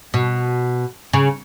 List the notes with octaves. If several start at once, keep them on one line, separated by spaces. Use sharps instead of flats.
B2
C#3